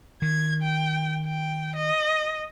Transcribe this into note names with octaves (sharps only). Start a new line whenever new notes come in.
D#3 G#6
G5
G5
D#5